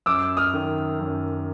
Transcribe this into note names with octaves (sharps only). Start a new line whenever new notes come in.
F#2 D6 E6
D#6 F6
D#3
F#2